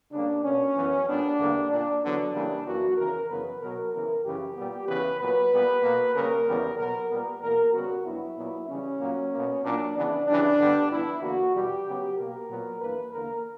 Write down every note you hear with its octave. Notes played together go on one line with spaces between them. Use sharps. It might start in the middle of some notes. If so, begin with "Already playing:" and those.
C#3 G3 A#3 D4
B2 A#3 C#4
F#2 E3 B3
A#2 G3 B3 D4
E2 D3 G3 A#3
A#2 A#3 D4
E2 D3 F#3 B3 D4
C#3 E3 G3 A#3
F#2 E3 A#3 F#4
E2 C#3 E3 A#4
F#2 C#3 E3 B3 B4
B2 F#3 B3 A#4
C#3 E3 B3 A#4
F#2 C#3 E3 G4
A#2 G3 B3
E2 C#3 E3 B3 B4
A#2 F#3 B3 B4
A#2 G3 B3
B2 A#3
C#3 G3 A#3 A#4
E2 C#3 G3 B3
B2 F#3 B3 A#4
A#2 G3 B3 A#4
E2 B2 A#3 A#4
C#3 G3 B3 F#4
G2 F#3 B3 E4
A#2 F#3 B3
C#3 E3 G3 C#4
A#2 F#3 A#3
B2 A#3
A#2 F#3 A#3 D4
C#3 E3 B3 D4
C#3 E3 G3 D4
G2 D3 G3 B3
G2 E3 B3 E4
E2 D3 A#3 F#4
E2 B2 G3 G4
C#3 F#3 B3
B2 A#3 A#4
A#2 F#3 B3
G2 E3 A#3 B4
E2 D3 A#3 A#4